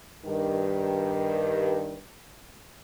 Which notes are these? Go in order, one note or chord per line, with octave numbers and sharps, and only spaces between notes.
G2 D#3